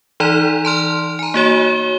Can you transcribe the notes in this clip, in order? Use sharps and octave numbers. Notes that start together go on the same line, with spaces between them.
E3 D#4 D5 A#5
A5 C6 F6
G#5 A#5
A#3 F#4 C#5 G7